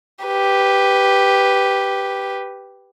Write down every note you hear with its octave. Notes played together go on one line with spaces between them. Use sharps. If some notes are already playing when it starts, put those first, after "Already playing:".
G4 B4